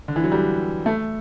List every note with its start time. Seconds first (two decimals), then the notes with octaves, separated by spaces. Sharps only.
0.08 D3
0.16 E3
0.24 F#3
0.32 G3
0.86 A3